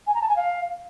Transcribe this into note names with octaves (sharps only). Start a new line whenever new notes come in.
G#5
A#5
A5
G#5
F5